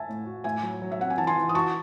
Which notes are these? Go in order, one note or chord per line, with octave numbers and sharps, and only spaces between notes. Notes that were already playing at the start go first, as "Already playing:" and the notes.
Already playing: E5 G#5 A5
A2
F#4
A2 E5 G#5
F#3
F#3
E5
C4 F#5
G#5
E3 A5
G#5 C6
E3
D#6
F#4 A5 C#6